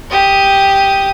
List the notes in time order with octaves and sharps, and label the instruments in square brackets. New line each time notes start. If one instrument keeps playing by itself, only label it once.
[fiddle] G4 D#6